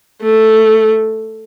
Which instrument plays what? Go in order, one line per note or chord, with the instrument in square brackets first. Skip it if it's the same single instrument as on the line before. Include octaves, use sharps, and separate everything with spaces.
[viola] A3